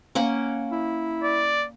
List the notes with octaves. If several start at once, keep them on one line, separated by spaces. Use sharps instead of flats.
A#3 C#4 F#5
E4
D5